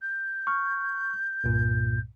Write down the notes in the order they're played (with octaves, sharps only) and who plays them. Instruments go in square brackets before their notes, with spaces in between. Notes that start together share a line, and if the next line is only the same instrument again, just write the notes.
[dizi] G6
[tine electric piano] C#6 F6
C2 G2 A#2